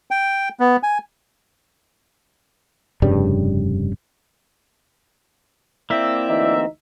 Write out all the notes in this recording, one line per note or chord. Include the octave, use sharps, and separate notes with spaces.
G5
B3
G#5
F1 G2 C#3 G3
A#3 C4 E4 D5 E5
D2 E3 D#4